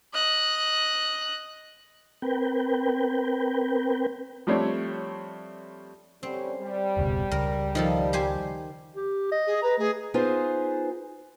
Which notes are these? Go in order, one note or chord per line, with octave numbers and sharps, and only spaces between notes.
D#5 F#6
C4 A#4 B4 G5
F3 G3 A3 C4 D4 C#5
D3 G3 C4 C#4
G3
F1 C#2 B2
C#2 A#4
D#3 F3 A4
G4 C5 G#5
G4
D#5
G#4
B4 A#5
A3 G#4
B3 D#4 F4 G#4 B4 C5